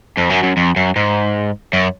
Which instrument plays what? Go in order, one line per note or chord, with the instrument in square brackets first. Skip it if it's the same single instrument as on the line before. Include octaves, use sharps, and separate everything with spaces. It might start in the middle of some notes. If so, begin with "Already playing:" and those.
[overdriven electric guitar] F2
F#2
F#2
F2
F#2
G#2
F#2